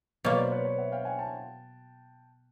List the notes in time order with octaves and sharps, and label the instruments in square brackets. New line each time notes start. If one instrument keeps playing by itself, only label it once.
[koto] B2 F#3 A#3 [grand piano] B4 C#5
[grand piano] C5 D5
B4 C#5
B4 C#5
E5 F#5
F5 G5
F#5 G#5
G5 A5